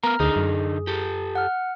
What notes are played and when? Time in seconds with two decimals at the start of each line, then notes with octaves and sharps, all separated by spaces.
0.03 B3 A#4 A#5 F6
0.20 D2 D3 D#4 G#4
0.36 F#2
0.87 G4 A4
1.35 F#5 F6